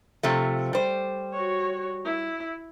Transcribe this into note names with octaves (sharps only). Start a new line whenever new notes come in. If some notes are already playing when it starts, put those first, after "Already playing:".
C3 F3 A3
G3 C5
F#4 C#5
E4